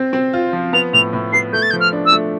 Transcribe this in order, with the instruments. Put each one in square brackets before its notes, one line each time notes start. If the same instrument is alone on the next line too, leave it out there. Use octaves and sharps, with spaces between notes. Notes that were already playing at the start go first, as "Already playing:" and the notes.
Already playing: [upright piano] C4 C5
C4
F4
F3
[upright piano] B3 [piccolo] F7
[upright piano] A2 [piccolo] F7
[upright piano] A2
[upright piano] B3 [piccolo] C7
[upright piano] A3 [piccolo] G6
[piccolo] A6
G6
[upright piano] F3
[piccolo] F6
[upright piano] D4
[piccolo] E6
[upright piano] A3